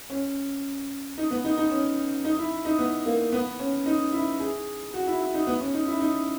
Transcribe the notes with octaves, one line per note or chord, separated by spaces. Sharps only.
C#4
D#4
B3
D#4
D#4
C#4
D#4
E4
D#4
B3
A#3
B3
C#4
D#4
E4
G#4
F#4
E4
E4
D#4
B3
C#4
D#4
E4
D#4